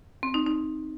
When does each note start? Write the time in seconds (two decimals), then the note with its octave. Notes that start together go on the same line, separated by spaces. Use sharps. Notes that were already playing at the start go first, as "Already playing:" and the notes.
0.23 C4
0.34 D#4
0.46 D#4